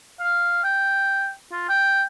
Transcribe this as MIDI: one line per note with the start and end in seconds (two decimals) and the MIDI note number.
0.20 0.60 77
0.64 1.32 79
1.52 1.67 65
1.69 2.04 79